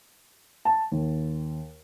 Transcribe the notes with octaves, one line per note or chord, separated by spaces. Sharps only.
A5
D#2